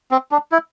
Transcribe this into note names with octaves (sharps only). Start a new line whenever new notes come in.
C4
D4
E4